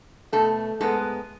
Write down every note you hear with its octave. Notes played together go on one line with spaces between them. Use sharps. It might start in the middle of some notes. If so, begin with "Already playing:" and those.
B2 A3 A4
G#2 G#3 B3 A4